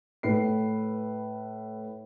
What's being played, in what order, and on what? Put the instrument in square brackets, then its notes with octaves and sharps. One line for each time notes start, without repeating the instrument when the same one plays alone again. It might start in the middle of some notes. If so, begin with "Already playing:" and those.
[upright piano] A2 B4 C7